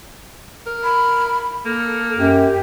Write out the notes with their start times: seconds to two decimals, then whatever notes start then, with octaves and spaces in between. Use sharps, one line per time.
0.67 A#4
0.84 B5
1.65 A#3 A4
2.18 F#2 G4